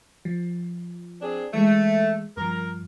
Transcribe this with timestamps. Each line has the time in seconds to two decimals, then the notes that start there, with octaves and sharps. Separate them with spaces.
0.25 F3
1.22 C4 D4 G#4
1.54 E3 G#3 A3
2.37 G2 F3 A#4